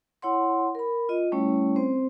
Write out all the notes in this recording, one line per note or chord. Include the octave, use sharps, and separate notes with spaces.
E4 C#5 F#5 C6
A#4 B5
F4 D#5
G3 A3 C#4 E4 C#5
C4 C5